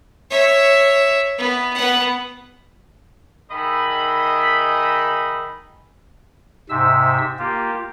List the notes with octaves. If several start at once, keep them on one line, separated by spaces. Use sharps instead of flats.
C#5 E5
B3
B3 F#5
D#3 G#4 D#5 E5 B5
G#2 C3 E5 E6
A#3 F4 G4